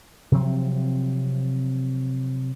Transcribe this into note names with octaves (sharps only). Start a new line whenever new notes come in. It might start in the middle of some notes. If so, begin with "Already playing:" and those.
C3 F3 F#3 C4